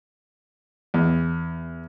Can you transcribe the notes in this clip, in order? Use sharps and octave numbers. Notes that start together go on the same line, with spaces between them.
E2